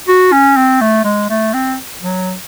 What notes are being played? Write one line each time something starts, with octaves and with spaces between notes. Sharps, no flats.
F#4
C#4
C4
A3
G#3
A3
C4
F#3